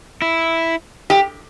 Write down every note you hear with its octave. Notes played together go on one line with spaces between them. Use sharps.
E4
G4